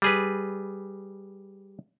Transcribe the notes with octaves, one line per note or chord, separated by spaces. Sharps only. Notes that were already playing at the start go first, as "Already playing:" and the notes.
G3 G#4 B4